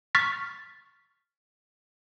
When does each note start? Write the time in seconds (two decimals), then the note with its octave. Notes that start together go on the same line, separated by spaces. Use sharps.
0.15 C#6 F6 A6 B6